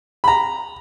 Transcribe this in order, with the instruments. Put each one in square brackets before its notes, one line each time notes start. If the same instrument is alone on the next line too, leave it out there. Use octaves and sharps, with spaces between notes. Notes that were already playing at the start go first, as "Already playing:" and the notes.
[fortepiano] A#5 B5